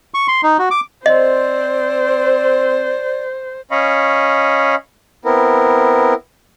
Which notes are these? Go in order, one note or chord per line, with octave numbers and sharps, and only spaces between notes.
C#6
C6
D#4
F#4
D6
C4 C5 D5 D#5
C#4 D#5 F5 B5 C#6
B3 C4 E4 A#4